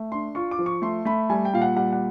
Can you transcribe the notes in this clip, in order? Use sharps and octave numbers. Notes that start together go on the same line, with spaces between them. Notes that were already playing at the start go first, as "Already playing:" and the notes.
Already playing: A3
D4 C6
F4 C#6
D6
F3
C#6
A3 C6
A3 B5
G3 G#5
G5
A#2 F5
F#5
G3 F#5
F#5